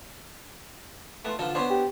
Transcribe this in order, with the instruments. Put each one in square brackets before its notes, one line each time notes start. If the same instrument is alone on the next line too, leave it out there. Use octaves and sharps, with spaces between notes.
[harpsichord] A3 [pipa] B3 C#4 F4
[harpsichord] D3 F3 [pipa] A4 B4
[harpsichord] B3 D4 [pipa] C5 C#5 B5
[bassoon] G4